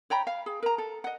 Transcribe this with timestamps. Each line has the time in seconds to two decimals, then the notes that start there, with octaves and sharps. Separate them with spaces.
0.10 C#5 G5 A#5 B5
0.27 F5
0.46 G#4
0.63 A#4 A#5
0.78 A4
1.04 D#5 F#5